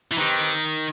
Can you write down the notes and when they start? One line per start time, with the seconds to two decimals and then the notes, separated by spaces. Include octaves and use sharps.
0.12 E3
0.18 D#3 C4 D#4 G4 B4